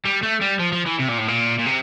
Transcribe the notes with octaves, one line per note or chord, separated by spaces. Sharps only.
G3
A3
G3
F3
F3
E3
C3
A#2
A2
A#2
A#2
C3